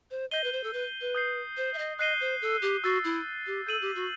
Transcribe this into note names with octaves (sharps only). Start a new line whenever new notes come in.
C5
D#5 G6 C7 D#7 G7
B4
C5
A4
B4
B4
D#6 G6 C7
C5
E5
D#5
D#5 F#6 C7 D#7 G7
C5
A4
G4
F#4 E6 A6 C7
E4
G4
A4 G6 D#7 F#7
G4
F#4